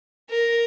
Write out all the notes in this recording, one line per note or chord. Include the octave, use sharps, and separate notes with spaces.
A#4